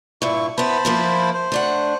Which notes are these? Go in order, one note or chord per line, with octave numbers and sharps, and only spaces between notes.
G2 A#2 E4 C#6
B3 E4 C5 A5 B5
F3 A#3 E4
C5
A3 D4 F#5